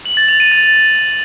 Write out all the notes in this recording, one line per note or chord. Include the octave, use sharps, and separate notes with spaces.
F#7
A6
F7
D#7
A6